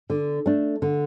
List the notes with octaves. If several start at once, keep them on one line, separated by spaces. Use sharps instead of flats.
D3
A3 D4
D3